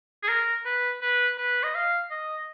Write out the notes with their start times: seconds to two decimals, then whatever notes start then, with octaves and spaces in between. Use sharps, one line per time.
0.23 G#4
0.29 A#4
0.65 B4
1.02 B4
1.38 B4
1.63 D#5
1.75 F5
2.11 D#5